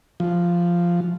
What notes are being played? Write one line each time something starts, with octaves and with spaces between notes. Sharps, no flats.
F3